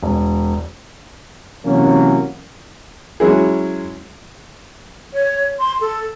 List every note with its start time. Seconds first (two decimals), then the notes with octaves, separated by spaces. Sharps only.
0.03 E1
1.65 C3 E3 F#3 A#3 C#4
3.20 F#3 G#3 C#4 E4 G#4
5.13 C#5
5.59 C6
5.81 A4